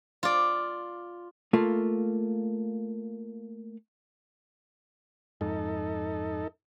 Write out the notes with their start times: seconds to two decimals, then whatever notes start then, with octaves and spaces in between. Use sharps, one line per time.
0.23 F4 D5
1.53 A3 A#3 F4
5.41 F2 G#2 D#4 A4